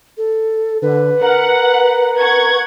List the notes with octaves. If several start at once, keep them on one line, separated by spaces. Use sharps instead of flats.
A4
D3 B4
A#4 F#5
F#5 C#6 G#6